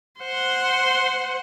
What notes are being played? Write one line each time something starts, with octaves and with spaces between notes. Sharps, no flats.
C5 F#5